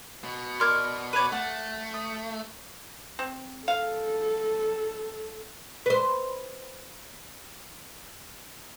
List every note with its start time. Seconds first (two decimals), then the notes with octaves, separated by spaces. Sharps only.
0.24 B2
0.60 A#4 D5 C6 F6 G#6
1.13 B4 C#5 D5 G#6 D#7
1.32 A3 F#5 A5
1.94 D#6
3.19 C4
3.68 A4 F5
5.86 B4 C5